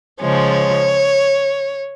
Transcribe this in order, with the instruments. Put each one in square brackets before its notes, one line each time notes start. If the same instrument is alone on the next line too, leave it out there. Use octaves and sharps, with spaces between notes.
[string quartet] C#3 F3 G#3 C#5